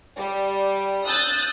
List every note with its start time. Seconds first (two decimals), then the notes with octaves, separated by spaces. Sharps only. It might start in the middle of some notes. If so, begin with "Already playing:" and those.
0.17 G3
1.06 D#6 E6 F#6 G6 A6